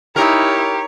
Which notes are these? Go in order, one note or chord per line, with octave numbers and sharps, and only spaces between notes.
D#4 E4 G4 A#4 C#5